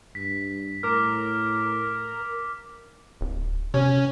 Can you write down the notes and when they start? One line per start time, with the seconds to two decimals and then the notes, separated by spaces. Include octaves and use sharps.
0.15 G2 B6
0.83 A2 A#4 D6 F6
3.21 D1
3.74 C3 C#4